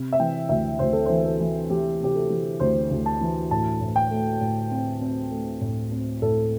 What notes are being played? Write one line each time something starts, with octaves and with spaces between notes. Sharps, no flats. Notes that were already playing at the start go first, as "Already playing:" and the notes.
Already playing: C3
E5
E3 G5
D2 E5
D2 C5
A4
C5
E3
A4
E3
E3 G4
C3 G4
A4
E3
D2 C5
D2
A5
E3
A2 A5
A2
G5
A3
A2
C4
C4
A3
A2
C4
A2 A4